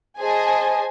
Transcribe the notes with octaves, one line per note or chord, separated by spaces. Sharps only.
G#4 C5 D#5 G#5 A5